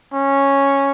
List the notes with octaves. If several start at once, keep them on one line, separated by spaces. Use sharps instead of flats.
C#4